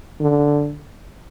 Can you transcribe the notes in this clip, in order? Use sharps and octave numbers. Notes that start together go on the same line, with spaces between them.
D3